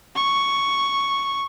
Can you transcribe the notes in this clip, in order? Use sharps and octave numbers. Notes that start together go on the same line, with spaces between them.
C#6